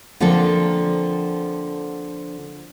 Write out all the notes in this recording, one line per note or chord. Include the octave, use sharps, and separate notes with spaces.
D3 F3 A#3 C4 A4